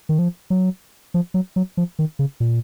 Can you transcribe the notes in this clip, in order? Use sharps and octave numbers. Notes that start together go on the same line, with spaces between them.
D#3
F3
F#3
F3
F#3
F#3
F3
D#3
C#3
A#2